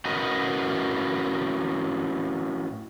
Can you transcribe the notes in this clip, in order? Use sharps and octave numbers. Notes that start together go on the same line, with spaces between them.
A2 C#4 F#4 A#4 B4 D#5